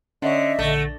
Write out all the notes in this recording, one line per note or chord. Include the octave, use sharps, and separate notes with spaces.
D3 C#4 C#5 D#5 E5
A#1 D3 A3 A#6